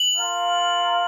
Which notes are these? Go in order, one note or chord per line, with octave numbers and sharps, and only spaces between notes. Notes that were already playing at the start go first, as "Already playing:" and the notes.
Already playing: F#7
F4 A#4 F5